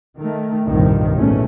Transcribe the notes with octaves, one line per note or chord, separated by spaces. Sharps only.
D#3 A3
F1 C2 G2 A#2 D#3 F3
G#1 E2 A#2 A3 C#4